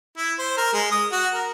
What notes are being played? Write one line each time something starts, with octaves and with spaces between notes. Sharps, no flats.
E4
C5
A#4
G#3
D#6
F#4
A#4